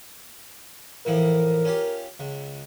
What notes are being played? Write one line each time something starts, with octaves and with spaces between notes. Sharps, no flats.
A2 E3 F3 A#4
C#4 F4 G4
C#2